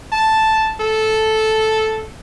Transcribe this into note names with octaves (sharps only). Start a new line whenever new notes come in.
A5
A4